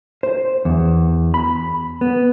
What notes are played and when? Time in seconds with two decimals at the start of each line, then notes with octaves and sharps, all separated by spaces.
0.23 C5
0.65 E2
1.34 B5
2.01 B3